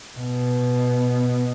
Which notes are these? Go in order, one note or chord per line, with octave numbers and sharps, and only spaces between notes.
B2